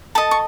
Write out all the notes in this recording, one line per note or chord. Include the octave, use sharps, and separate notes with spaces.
A4 D#5 A5
C#6